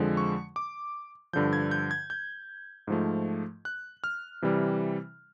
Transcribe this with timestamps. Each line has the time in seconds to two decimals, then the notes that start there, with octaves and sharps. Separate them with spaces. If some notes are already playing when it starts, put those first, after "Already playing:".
Already playing: F2 D3 F3 G#3
0.17 C#6
0.56 D6
1.33 G2 D3 F3 G6
1.53 G#6
1.71 G6
1.91 G#6
2.10 G6
2.87 G#2 F3 A3
3.65 F#6
4.04 F6
4.42 C3 E3 G3